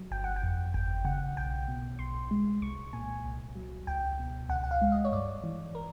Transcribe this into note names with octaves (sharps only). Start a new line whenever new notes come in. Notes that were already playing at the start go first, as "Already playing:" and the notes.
Already playing: F#3
G1 G5
F#5
G5
F2
G1 G5
C#3 F#5
B1 G5
B2
B1 C6
G#3
C2 C#6
A#2 G#5
C2
F#3
C#2 G5
B2
C#2 F#5
F#5
F5
G#3
D#5
C#5
G2 D5
E3
A#4